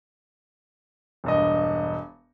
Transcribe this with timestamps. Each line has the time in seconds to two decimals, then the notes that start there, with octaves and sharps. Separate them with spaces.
1.24 E1 G2 D#5